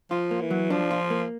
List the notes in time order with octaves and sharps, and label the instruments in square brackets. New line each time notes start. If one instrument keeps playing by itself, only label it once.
[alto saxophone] F3 [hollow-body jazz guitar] F4
[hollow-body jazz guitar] A#3
[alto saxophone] E3
[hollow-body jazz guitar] F#3
[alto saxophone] F3 [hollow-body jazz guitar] D4
[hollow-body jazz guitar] F4
A#3